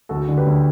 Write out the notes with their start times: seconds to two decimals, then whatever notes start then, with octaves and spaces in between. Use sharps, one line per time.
0.09 D2 F#4 A4
0.29 D3
0.38 G4 B4
0.47 D2